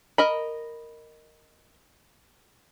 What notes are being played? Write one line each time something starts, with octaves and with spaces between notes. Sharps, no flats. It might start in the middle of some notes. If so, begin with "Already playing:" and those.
A#4 D#5 B5